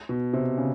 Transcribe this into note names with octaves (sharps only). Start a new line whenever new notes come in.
B2
C3
C#3